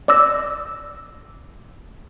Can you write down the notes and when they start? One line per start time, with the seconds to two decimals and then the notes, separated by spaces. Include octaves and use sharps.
0.08 D5 D6 E6 A#6